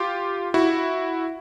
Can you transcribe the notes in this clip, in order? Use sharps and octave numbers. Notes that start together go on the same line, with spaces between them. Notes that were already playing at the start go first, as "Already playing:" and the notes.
Already playing: F4 G4
E4 F#4